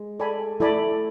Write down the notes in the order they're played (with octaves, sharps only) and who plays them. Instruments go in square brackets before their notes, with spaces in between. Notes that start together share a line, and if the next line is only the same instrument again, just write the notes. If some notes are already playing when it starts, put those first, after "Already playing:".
Already playing: [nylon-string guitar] G#3
[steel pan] A4 D5 G#5 B5
[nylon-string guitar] A3 [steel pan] E4 A4 D5 G#5 B5